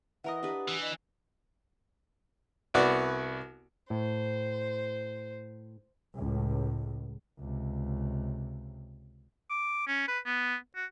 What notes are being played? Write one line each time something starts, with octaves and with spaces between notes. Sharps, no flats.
E3 A#4 D#5 E5 F#5 A#5 D#6
D4 G4 B4
E3
D#5
C2 B3 F#4 D5
A2 C5
C#2 A2
C#2 C3
D6
C#4
B4
B3
F#4